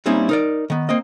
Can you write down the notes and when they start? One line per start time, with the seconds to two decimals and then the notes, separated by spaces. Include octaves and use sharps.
0.06 G3 A#3 C4 C#4 D#4 E4
0.29 D#4 A#4 D5
0.70 D#3 B3
0.89 A#3 C4 D#5